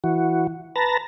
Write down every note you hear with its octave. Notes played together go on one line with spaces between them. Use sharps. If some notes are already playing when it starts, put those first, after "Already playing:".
E3 F#4
B4 A5 A#5